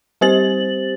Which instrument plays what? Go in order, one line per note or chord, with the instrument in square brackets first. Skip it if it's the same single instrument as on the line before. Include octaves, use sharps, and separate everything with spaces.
[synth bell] G3 C4 G4 C5 A6 F#7